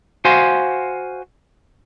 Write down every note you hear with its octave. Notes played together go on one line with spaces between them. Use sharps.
F#4 C5 F5 G#5 C6